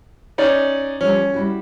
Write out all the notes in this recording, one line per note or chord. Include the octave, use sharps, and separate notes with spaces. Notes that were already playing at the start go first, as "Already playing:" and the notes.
C#4 D#4 D5
F3 G3 C#4
G3 E4 F#4